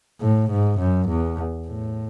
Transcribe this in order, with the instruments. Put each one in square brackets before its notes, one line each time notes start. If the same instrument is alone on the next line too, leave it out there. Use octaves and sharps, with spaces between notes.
[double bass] A2
G#2
F#2
E2
A2